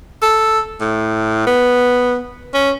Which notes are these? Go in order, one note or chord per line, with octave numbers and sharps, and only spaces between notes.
A4
A2
B3
C#4